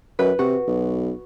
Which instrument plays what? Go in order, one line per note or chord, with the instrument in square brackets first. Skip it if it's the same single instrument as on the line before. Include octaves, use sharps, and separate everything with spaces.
[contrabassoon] F#2 [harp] B4
[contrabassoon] C3 [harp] F#4
[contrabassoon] B1